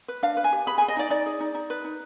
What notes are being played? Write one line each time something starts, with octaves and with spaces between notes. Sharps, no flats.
B4
D4 F5
B4
G#5
G4
G#4 B5
G#5
G#4
D#5
D#4 D5
D#4 D5
G#4
D#4
D#4
B4
D#4